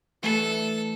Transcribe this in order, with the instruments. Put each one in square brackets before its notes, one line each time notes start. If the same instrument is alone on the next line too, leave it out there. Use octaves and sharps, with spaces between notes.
[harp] E3 A3 D4 [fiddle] A4